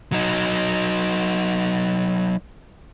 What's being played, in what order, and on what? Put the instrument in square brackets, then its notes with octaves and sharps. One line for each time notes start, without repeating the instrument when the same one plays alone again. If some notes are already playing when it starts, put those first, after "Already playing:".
[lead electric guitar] F#3 D#4